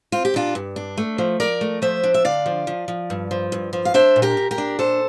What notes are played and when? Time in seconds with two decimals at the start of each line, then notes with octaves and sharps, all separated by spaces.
0.12 C4 F4
0.25 G4
0.34 A#2 D4 F4
0.55 G2
0.76 D4
0.98 A3
1.18 F3
1.40 F3 A#4 D5
1.61 A3
1.82 F3 C5 E5
2.03 D4
2.14 E5
2.25 D3 D5 F5
2.46 F3
2.67 F3
2.88 F3
3.10 G2
3.31 F3
3.52 G2
3.73 F3
3.85 F5
3.94 D4 C5 E5
4.16 A#2
4.22 G4 A#4
4.37 A#2
4.51 G4 A#4
4.58 D4
4.79 A#2 A4 C5